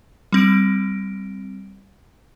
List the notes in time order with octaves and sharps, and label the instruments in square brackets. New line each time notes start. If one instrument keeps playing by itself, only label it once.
[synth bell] G3 C4 D7